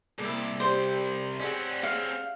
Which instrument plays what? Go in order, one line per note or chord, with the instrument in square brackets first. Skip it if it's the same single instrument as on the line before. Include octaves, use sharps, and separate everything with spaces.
[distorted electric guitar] C2 [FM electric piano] G#3 A#3 G#4 [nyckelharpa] E4 D6
[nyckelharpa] G4 [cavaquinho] C5 [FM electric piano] D5
[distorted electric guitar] C4 C#4 [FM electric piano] G#4 D5 [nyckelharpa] F#5
[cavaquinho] F5